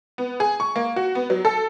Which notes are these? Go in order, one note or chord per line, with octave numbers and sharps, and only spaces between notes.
B3
G#4
C#6
A#3
F#4
B3
F#3
A4